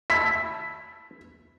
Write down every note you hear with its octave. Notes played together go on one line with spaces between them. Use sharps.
E4 A5 B6